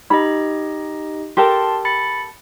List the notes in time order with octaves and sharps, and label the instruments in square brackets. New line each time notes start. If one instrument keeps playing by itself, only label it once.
[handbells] D#4 G4 D#5 [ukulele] B5
[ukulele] G4 A4 A#4 [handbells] A5 C6
[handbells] B5 A6 C#7